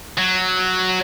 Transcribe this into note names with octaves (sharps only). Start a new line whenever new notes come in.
F#3